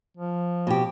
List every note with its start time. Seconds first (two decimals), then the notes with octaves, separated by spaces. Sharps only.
0.17 F3
0.67 B2 G4